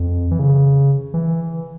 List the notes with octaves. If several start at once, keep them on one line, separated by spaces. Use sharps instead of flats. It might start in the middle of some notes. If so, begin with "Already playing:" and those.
Already playing: F2
E3
C#3
E3